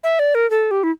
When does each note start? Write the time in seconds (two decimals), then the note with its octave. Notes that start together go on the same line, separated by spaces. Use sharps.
0.04 E5
0.19 D5
0.35 A#4
0.50 A4
0.71 G4
0.83 E4